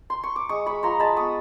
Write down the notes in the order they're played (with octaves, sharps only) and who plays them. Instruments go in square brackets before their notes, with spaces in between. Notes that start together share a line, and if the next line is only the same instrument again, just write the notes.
[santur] C6
C#6
D6
G#3 C#6 D#6
G#3 B5 C#6
F3 A#5 C6
G#3 A5 B5
B3 C#6 D#6